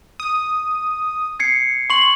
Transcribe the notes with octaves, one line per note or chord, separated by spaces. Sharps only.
D#6
G#6 C7 C#7
C6 C#6 F#7